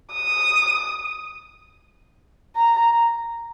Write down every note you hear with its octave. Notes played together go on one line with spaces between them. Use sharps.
D#6
A#5